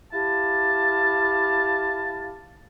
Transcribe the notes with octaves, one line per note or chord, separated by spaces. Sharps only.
E4 G4 F5 A5